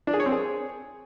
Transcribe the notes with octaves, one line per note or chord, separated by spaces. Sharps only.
D4
G#4
C#5
C4
G#4